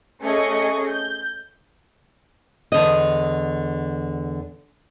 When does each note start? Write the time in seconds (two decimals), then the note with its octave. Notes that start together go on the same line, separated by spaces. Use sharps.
0.22 A3 C#4 G#4 D#5 C#6
0.88 G6
2.72 E2 D3 D#5